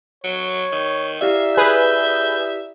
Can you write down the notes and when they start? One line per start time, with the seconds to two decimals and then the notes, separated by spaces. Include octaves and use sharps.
0.24 F#3 C#5
0.72 D#3
1.21 E4 G4 D5 E5 F5
1.57 G#4 B4 G6